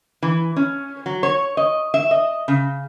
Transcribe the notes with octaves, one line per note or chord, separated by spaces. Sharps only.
E3
C#4
F#3
C#5
D#5
E5
D#5
C#3